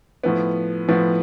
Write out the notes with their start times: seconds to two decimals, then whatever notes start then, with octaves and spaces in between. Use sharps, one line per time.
0.24 A2 F3 B3
0.89 A2 F3 B3